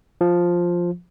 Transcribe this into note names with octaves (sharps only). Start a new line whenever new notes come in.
F3